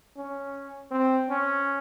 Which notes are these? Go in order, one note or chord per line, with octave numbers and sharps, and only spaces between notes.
C#4
C4
C#4